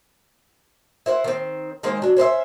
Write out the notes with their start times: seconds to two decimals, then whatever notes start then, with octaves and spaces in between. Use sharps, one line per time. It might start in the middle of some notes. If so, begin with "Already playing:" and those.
1.06 E4 C5 D5 F#5
1.24 D#3 C4
1.83 D#3 G#3 A#3 C4
2.02 F#3 D4
2.17 C#4 C5 C#5 E5